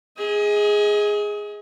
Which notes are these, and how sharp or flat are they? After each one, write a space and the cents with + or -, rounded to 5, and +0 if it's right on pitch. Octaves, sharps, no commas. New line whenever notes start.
G#4 +0 D#5 +35